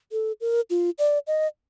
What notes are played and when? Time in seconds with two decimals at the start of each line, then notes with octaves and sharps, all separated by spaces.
0.12 A4
0.41 A#4
0.70 F4
0.98 D5
1.27 D#5